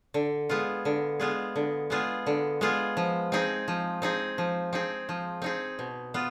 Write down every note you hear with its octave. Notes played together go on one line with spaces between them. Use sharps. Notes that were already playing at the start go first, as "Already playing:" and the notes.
D3
G#3 B3 F4 G#4
D3
G#3 B3 F4 G#4
D3
G#3 B3 F4 G#4
D3
G#3 B3 F4 G#4
F3
C4 D#4 G#4
F3
C4 D#4 G#4
F3
C4 D#4 G#4
F3
C4 D#4 G#4
B2
B3 F4